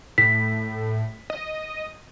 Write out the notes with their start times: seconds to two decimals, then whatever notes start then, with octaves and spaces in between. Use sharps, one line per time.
0.18 A2 B6
1.30 D#5